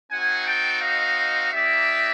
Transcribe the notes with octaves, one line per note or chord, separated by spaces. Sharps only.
C4 D#4 F#4 F#5 G#5
G5 A5
D#5 F5
A#3 D#4 G4 D5 E5